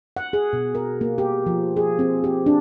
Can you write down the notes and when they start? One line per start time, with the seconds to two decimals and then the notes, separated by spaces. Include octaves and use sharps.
0.17 F#5
0.33 G#4
0.53 B2
0.75 A#4
1.01 A#3
1.18 G4
1.46 F3
1.77 G#4
1.99 C4
2.24 G4
2.46 D4